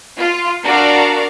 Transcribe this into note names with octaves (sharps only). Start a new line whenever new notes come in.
F4
D4 F#4 A#4 D5 F5 A#5